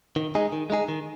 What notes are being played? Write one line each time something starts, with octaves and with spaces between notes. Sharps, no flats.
D#3
G#3 D#4 G#4
D#3
G#3 D#4 G#4
D#3